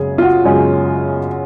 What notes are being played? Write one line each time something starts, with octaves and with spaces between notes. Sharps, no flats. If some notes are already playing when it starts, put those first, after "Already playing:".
Already playing: F#2 C#3 G#3 C#4 G#4
F4
F#4
F#2 C#3 G#3 C#4